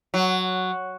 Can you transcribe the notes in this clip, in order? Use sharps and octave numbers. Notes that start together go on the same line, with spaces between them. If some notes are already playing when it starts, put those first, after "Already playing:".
F#3